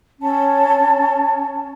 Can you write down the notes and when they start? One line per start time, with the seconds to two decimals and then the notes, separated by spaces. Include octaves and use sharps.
0.20 C#4 A5